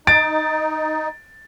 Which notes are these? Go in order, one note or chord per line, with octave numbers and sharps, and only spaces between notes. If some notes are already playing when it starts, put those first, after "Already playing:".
D#4 A6 D7